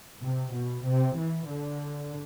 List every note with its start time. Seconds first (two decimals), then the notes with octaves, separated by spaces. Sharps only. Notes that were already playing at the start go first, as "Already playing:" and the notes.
0.22 C3
0.52 B2
0.85 C3
1.16 E3
1.47 D3